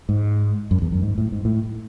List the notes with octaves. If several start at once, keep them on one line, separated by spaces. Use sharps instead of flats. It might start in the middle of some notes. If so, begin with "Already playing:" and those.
G#2
F#2
E2
F#2
G#2
A2
G#2
A2